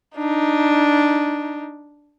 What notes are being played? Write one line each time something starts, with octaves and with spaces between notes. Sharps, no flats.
D4 D#4